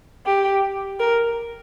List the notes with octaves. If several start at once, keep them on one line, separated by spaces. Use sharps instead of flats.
G4
A#4